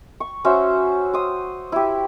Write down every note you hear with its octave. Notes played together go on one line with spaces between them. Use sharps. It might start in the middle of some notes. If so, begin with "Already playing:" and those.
C#6
C#4 F#4 C5 E5
C5 D#6
E4 G4